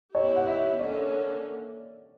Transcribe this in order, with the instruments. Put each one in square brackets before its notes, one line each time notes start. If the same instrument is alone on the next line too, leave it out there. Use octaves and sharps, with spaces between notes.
[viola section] B3 E4 G4 [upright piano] C#5
[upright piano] F#5
E5
[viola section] D3 A#3 C#4 [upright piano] D5